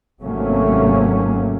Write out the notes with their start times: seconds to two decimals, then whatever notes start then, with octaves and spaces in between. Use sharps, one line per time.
0.22 G#1 C3 F#3 A3 A#3 C#4